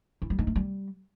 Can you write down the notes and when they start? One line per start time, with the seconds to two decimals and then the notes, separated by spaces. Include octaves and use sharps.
0.22 E4
0.30 G3
0.39 D#4
0.47 A3
0.56 G3